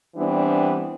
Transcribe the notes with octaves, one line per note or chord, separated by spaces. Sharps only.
E3 G3 B3 C4 D4